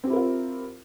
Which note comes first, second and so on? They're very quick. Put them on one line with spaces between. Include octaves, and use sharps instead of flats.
C4 G4 E4 A#4 F4